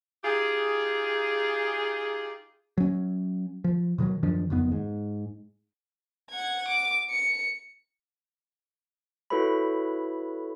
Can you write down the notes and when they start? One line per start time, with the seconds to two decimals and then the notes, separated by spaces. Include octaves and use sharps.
0.24 D#4 F4 G4 G#4
2.78 F#3 C#4
3.64 F3
3.98 B2 D#3 F3 F#3
4.23 F#2 D#3 F3 D4
4.50 F#1 F2 D#3 B3
4.72 G#2
6.30 F#5 G#6
6.68 D6
7.10 C#7
9.30 E4 F#4 A4 B4 C#5 B5